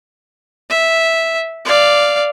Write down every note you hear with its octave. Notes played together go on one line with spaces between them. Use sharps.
E5
D5 F5